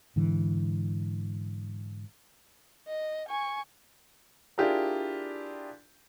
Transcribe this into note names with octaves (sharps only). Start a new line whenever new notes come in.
G#2 D3 E3
D#5
G#5 C#6
D4 E4 F4 G4 G#4 A#4